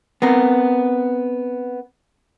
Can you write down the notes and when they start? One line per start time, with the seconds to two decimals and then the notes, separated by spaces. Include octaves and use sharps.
0.22 B3 C4 A#4